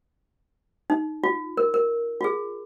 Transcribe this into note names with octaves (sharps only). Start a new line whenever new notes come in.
D#4
F4
A#4
A#4
F4
G#4